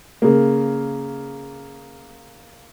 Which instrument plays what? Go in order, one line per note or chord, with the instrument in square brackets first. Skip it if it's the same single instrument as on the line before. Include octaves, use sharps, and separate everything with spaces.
[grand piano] C#3 A#3